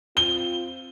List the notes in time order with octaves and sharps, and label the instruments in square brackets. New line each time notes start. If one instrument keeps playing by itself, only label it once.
[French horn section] C4 F4 [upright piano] G7